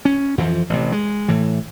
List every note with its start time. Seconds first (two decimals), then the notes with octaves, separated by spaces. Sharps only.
0.05 C#4
0.38 F2 E3 F3
0.70 A1 C3
0.92 G#3
1.28 A2 E3